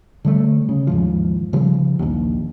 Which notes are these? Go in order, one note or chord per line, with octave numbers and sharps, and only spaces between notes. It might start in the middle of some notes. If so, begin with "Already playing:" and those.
D3 G3 A3
C#3
D#2 G#2 F3
C#3 F3 G3
A#1 D#2